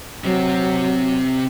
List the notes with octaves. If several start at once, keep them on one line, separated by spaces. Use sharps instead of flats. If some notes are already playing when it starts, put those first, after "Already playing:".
C3 F#3 C4